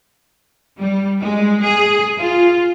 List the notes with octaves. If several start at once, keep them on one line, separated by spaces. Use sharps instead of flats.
G3
G#3
G#4
F4